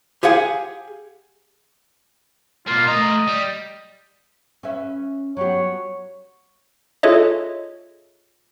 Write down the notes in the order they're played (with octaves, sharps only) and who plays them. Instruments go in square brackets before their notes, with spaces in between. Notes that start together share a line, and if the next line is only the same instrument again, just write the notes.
[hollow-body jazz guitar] G4 G#4 F5 F#5 G#5
[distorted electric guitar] B2 A#3 [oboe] F4
[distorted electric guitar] A3 A#5 [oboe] D#5
[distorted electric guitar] G3
[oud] C#4 B4 E5
[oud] F#3 B3 G4 [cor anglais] C#5
[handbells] F4 G#4 A4 C#5 D#5 E5